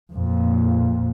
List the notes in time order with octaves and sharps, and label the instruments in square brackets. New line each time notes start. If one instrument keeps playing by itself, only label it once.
[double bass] F2 A#2